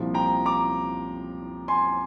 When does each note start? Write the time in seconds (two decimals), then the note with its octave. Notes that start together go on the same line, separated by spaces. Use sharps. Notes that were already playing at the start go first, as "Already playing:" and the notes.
Already playing: C2 A#2 F3
0.14 G5 A#5
0.46 A#5 D6
1.68 G#5 C6